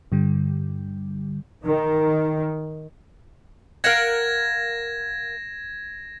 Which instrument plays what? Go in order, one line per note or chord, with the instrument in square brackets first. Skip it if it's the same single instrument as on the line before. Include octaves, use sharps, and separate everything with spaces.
[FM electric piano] G2 D3 G3
[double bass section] D#3
[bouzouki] A#4 F5 F#5 [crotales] G#6 A#6 E7